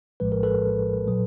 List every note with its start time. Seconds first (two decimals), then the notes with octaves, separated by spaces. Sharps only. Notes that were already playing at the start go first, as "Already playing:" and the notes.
0.20 A#1 A2 F3 G#3 B4
0.32 A#4
0.43 A4 B4
1.08 A#2 F#3